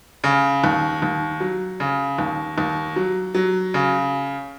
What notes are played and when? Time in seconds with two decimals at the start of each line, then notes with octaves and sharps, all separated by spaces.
0.24 C#3
0.64 D#2
1.02 D#2
1.40 F#3
1.80 C#3
2.18 D#2
2.58 D#2
2.96 F#3
3.34 F#3
3.74 C#3